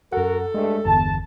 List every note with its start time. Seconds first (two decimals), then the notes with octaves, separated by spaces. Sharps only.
0.13 F#2 F#4 A4 A#4 F#5
0.55 G2 G#3 A3
0.85 G1 E2 A5